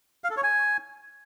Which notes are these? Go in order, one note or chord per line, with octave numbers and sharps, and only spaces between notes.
F5
A4
C#5
G#5